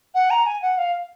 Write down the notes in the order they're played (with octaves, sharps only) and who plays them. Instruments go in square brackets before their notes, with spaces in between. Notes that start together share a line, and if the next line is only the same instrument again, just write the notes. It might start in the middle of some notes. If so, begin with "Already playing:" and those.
[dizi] F#5
A#5
G#5
F#5
F5